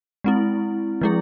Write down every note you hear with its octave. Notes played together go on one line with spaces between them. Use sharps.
G#3 C4 E4
F3 G#3 E4 G#4